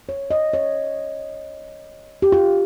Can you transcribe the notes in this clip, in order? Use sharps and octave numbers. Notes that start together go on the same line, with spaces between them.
C#5
D#5
C#5
G4
F4